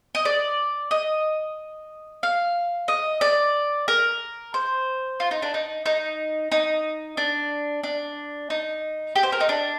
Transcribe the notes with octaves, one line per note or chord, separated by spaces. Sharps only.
D#5
D5
D#5
F5
D#5
D5
A#4
C5
F4
D#4
D4
D#4
D#4
D#4
D4
D4
D#4
G4
C5
A#4
D#4
D4